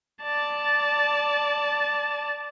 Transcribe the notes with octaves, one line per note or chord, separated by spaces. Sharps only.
D5 A5